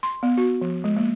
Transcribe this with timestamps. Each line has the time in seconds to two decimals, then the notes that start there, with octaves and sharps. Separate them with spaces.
0.03 C6
0.23 B3
0.38 F#4
0.61 F3
0.84 G#3
0.97 A#3